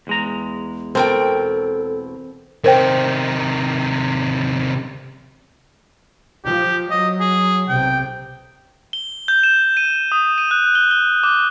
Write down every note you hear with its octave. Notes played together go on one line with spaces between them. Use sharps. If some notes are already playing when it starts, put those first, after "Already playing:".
E2 G#3 A#5
B2 C4 A4 A#4 G5
C3 D#3 A#4 C5 G5
F3 G4
F#3 D#5
G#4
B1 C3 G5
G7
G6
E7
D#7
D#6
D#7
F#6
G7
G7
D6